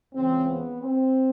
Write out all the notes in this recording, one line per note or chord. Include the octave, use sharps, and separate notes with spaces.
C#2 C#3 E3 C4
B3
C4